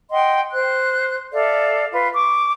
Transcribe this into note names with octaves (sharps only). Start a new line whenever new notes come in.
D#5 F#5 G5 C6
C5 F#6
A4 D5 E5 F5
F4 B4
C#6 D6